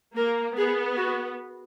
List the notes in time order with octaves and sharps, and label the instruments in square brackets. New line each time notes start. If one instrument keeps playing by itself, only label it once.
[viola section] A#3 [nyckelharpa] A#4
[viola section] B3 [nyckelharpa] G#4
[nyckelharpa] F#4